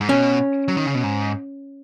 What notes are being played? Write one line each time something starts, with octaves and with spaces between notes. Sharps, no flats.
G#2
B2 C#4
F#3
D#3
C#3
B2
G#2